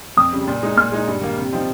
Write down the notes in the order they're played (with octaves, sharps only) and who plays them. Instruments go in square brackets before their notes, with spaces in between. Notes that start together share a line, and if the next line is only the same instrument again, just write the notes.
[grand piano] F2 [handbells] D#6
[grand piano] C#3 G3
A#2
G#3 D#4
[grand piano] A#2 [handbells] F6
[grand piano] G#3 D#4
G2
D#3 A#3
C3
F3 C4 D#4